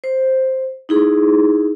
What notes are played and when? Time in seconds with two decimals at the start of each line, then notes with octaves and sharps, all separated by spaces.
0.04 C5
0.89 D#4 E4 G#4